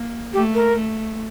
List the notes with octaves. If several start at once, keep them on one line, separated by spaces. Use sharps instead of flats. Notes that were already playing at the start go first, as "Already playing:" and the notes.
Already playing: A#3
A3 G4
A#4
A3